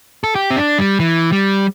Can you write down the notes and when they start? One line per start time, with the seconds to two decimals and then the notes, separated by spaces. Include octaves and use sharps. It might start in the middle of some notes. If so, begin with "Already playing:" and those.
0.24 A4
0.35 G4
0.51 C4
0.56 D4
0.78 G3
1.00 E3
1.32 G3